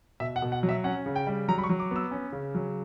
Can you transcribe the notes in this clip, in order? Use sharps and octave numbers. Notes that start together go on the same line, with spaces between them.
B2 E5
F#5
B2
F#5
F#3
E5
C#4 F#5
C#3
G5
G3
F#3 A#5
B5
C#6
F#3
D6
B3 E6
C#4
C#3
F#3